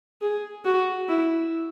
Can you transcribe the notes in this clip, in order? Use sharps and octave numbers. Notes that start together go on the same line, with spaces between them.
G#4
F#4
E4